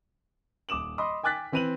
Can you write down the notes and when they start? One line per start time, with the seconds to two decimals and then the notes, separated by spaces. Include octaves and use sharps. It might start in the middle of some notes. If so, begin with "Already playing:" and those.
0.69 D#1 D6 D#6 E7 F#7
0.98 D#5 B5 C6 D6 D#6
1.23 G5 G#5 D6 F#6 A6 B6
1.52 E3 C4 B4 D#7 F7 F#7